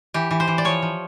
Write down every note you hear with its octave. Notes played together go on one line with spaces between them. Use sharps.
E3 G4
E3
C5
E3
D5
F3 C#5
F3